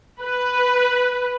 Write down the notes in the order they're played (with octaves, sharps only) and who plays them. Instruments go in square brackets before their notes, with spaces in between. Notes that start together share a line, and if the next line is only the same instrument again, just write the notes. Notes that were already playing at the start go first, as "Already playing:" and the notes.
[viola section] B4